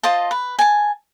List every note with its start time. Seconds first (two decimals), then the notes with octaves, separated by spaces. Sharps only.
0.03 F4 C5 D#5 A5
0.31 B4
0.59 G#5 A5